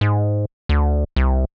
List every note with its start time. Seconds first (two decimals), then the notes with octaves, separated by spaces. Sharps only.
0.01 G#2
0.69 D2
1.16 C2